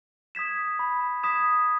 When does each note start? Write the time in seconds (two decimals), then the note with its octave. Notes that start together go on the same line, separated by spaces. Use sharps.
0.35 D#6 G#6 B6 E7
0.79 B5
1.23 D#6 G#6 B6 E7